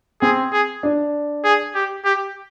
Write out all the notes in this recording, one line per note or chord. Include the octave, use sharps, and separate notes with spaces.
C4 G#4
G#4
D4
G#4
G4
G4